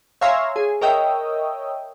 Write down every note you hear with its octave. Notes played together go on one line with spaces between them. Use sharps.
C#5 E5 F5 G#5 A#5 C6
G#4
A#4 C#5 D#5 E5 G5